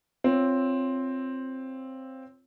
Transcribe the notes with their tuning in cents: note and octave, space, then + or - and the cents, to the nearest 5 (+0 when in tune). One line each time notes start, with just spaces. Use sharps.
C4 +5 F4 +0 C#5 +0